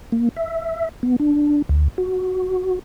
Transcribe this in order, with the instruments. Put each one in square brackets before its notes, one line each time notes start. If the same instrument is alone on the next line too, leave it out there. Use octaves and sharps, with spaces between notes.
[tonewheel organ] A#3
E5
B3
D4
D2
F#4